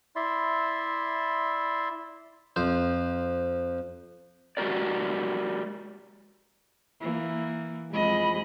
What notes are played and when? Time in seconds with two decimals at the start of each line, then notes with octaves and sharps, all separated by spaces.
0.16 E4 D5 E5 C6
2.56 F2 C5
4.57 G#3 F#4 G4 A#4 D5
7.00 E3 A#3
7.93 F2 G#3 D#5 B5